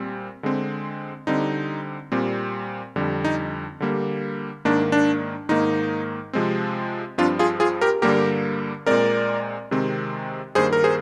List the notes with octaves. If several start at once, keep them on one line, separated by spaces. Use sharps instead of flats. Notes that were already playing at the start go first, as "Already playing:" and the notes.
Already playing: A#2 G3 C4
D3 G#3 C4
D3 G3 C4 D#4
A#2 G3 C4
F2 D3 G3
D#4
D3 G3 A#3
G#2 D#3 A#3 D4
D4
G#2 D#3 A#3 D#4
C3 F3 G#3 C4
G2 F3 C4 D4 F4
F4 G#4
F4 G#4
G4 A#4
G2 D3 G3 A#3 G4 A#4
A#2 G#3 C4 A#4 D5
C3 D#3 G#3 C4
G2 D#3 A#3 G#4 C5
A#4
G#4 C5